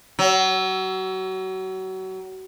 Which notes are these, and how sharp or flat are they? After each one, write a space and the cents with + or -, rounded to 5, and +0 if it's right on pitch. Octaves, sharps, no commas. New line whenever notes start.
F#3 +30